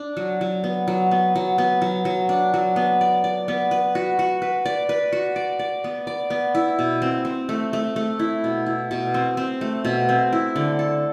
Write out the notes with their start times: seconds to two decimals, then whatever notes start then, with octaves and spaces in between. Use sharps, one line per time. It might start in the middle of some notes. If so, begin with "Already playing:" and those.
Already playing: D4
0.17 F#3
0.41 F#3
0.64 B3
0.88 F#3
1.11 B3
1.36 F#3
1.58 B3
1.82 F#3
2.05 F#3
2.29 D4
2.54 F#3
2.76 B3
3.01 D5
3.24 D5
3.48 B3
3.71 B4
3.95 F#4
4.19 F#4
4.42 B4
4.66 D5
4.89 B4
5.12 F#4
5.36 D5
5.59 D5
5.84 B3
6.07 D5
6.30 B3
6.55 E4
6.79 B2
7.02 C4
7.25 C4
7.49 A3
7.73 A3
7.96 A3
8.19 E4
8.44 B2
8.66 E4
8.91 B2
9.14 C4
9.37 C4
9.61 A3
9.85 B2
10.09 C4
10.33 E4
10.56 D3
10.79 A4